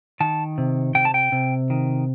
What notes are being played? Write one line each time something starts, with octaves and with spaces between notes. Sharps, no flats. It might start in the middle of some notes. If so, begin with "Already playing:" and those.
D#3 A5
C3
C3 G5
A5
G5
C3
D#3